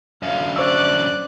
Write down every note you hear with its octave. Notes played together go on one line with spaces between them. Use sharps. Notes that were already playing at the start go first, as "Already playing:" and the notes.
F#2 D3 F5
C5 D5 C#6 E6 F#6